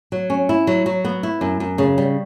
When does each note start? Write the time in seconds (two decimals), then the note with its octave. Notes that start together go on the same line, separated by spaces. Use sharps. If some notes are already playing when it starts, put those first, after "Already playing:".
0.12 F#3
0.30 C#4
0.49 E4
0.67 F#3
0.86 F#3
1.05 B3
1.23 E4
1.41 F#2
1.60 F#2
1.78 C#3
1.98 G3